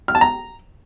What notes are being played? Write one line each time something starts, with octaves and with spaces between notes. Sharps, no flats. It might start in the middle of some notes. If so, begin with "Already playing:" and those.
F6
A5
A#5